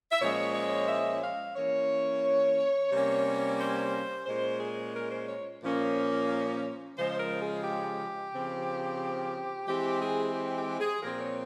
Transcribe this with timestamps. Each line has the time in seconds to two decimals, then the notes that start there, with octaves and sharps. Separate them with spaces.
0.11 E5
0.21 A#2 F3 G#3 C#4 C#5
0.55 C#5
0.88 E5
1.23 F5
1.56 E3 A#3 C#4 C#5
2.91 C3 G3 A#3 C#4
3.59 C5
4.26 A#2 G#3 C#4 C5
4.60 G#4
4.94 A#4
5.11 C5
5.28 C#5
5.62 A#2 F3 A#3 C#4
6.97 C#3 F3 G#3 C5
7.19 A#4
7.41 G#4
7.64 G4
8.32 C#3 F3 C4
9.67 E3 G#3 C4 G4
10.01 G#4
10.34 G4
10.57 G4
10.80 G#4
11.02 A#2 F3 C4 A#4
11.19 C#5